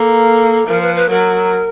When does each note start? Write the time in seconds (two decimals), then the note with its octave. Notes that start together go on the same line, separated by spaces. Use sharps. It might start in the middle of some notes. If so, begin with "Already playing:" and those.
Already playing: A#3 A4
0.67 F3 A#4
0.81 B4
0.96 B4
1.09 F#3 A#4